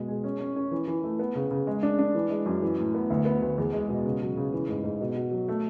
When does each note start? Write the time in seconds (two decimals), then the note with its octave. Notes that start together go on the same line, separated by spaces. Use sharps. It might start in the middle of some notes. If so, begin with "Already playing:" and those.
Already playing: B2 G#3
0.08 G#4
0.24 C#4
0.40 C#4
0.56 C#4
0.71 E3
0.88 E3
1.03 A3
1.19 B3
1.35 C#3
1.51 C#3
1.67 G#3
1.83 D4
1.99 D4
2.15 E3
2.30 G#3
2.46 F#2
2.62 E3
2.78 A2
2.95 B3
3.10 D2
3.25 B3
3.42 D2
3.58 E2
3.73 G#3
3.89 B2
4.05 C#3
4.21 F#3
4.37 C#3
4.52 E3
4.69 G#2
4.84 G#2
5.00 B2
5.16 F#4
5.31 F#3
5.48 A3